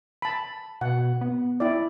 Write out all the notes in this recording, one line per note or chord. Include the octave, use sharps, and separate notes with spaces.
A5 B5
B2 F#5
B3
E4 D5